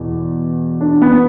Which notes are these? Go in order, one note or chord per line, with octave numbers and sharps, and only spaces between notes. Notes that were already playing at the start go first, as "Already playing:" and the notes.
Already playing: E2 B2
D4
B3